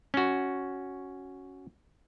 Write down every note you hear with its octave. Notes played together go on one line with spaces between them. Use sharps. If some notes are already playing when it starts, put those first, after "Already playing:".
C#4 F#4